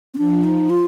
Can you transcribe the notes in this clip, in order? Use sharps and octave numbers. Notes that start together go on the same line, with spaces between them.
C4
F3 D4
D#4
F4